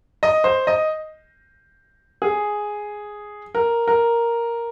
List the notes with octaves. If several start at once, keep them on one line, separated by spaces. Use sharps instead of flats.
D#5
C5
D#5
G#4
A#4
A#4